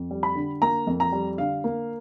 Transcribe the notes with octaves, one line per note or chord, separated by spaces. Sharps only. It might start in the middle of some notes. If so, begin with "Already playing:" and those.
Already playing: F2
G3
B5
D3
A#3 A#5
F2
A#5
G3
D3 F5
A#3